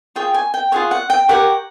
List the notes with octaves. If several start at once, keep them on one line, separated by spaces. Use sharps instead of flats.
F4 G#4 C#5 G5
G#5
G5
F4 G#4 C#5 F#5
F#5
G5
G4 A#4 C#5 F#5